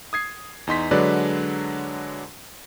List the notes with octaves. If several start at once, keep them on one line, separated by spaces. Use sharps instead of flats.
D#6 G#6 C7
E2 D#4 C6 B6
D3 F#3 G#3 D4 B4 D5